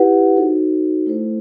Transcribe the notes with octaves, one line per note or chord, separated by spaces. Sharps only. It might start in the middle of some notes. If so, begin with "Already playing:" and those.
Already playing: E4 G4 B4 F#5
D#4 F#4 A4 C5
A3 E4 A4 C5